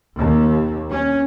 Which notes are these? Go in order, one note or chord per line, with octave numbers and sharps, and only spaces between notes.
D#2
C#4